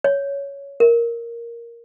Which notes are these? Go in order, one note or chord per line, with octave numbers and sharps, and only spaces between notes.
C#5
A#4